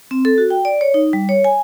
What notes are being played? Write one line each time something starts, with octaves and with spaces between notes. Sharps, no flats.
C4
A4
F#4
G5
D5
C#5
D#4
G3
C#5
G#5